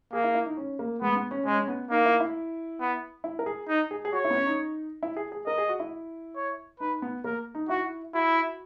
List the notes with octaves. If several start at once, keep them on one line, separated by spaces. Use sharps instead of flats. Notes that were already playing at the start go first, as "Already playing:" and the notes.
A#3 G#4
E4
E4
D#4
C#4
A#3
G#3 B3
B3
C#4
G#3 C#4
C#4
B3
A#3 D#4
E4
E4
B3
E4
A#4
G#4
D#4
G#4
G#4
F#4 C#5
E4
B3
C#4
D#4
E4
G#4
G#4
A#4 D#5
G#4
F#4
E4
C#5
D#4 B4
B3
A#3 A#4
D#4
E4 F#4
E4 F#4